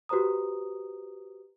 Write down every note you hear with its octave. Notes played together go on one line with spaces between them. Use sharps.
F#4 G4 B4 C5 A#5 D#6